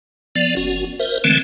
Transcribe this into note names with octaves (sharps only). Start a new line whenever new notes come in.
F3 B3 D5
F#1 C#4 F#4
A#4 C5 E5
D3 E3 G#3 A3 C4